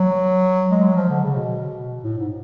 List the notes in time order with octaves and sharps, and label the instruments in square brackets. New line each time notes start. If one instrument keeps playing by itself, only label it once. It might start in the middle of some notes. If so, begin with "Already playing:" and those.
Already playing: [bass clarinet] F#3
G#3
F#3
F3
D3
C#3
B2
A2
G#2